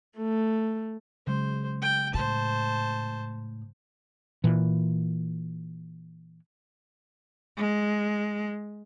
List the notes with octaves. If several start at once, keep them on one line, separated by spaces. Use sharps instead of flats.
A3
C#3 F#3 G#3 C5
G5
A2 C5 A5
A#2 E3
G#3